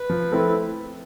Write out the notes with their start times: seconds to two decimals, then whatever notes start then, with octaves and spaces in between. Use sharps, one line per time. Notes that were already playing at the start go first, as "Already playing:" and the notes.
Already playing: B4
0.10 F3
0.32 A3 C4 E4 A4